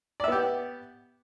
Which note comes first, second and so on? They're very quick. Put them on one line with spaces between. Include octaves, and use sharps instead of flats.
D5 E5 B3 G4